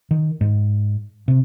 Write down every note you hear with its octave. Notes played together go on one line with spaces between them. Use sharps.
D#3
G#2
C3